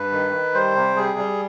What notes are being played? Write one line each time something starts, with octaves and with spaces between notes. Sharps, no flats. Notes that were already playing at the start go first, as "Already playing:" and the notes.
Already playing: G2 B4
D#3
D#3
G3 C5
C3
G3 G#4
G3